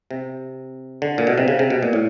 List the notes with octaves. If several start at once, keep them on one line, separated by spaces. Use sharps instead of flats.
C3
D3
A#2
B2
C3
C#3
C3
B2
A#2
A2